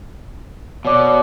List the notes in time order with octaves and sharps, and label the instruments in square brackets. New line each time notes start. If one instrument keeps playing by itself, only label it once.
[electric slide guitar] B2 [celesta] C#5 D5 D6